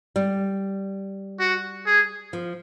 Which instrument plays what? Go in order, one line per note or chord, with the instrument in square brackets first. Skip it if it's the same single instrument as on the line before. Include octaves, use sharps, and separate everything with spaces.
[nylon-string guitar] G3
[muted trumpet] F#4
G#4
[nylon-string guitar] F3